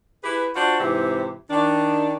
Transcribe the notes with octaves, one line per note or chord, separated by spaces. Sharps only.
E4 G4 G#4 B4
D4 F4 F#4 C5 D5
G#2 C3 E3 C4 E4
D#3 D4